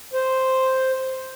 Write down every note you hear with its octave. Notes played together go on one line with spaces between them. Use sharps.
C5